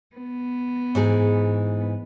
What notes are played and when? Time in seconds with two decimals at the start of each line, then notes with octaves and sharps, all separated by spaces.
0.16 B3
0.95 G#2 E3 G#4